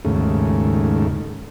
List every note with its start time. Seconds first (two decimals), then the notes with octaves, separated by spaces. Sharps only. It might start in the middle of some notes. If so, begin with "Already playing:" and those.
0.05 D#2 G#2 C#3 A3